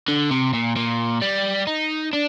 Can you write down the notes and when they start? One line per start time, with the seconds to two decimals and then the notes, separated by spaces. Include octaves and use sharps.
0.08 D3
0.31 C3
0.53 A#2
0.76 A#2
1.22 G3
1.67 D#4
2.13 D4